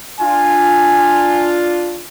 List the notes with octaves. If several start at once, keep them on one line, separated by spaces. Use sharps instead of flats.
D4 F4 G#5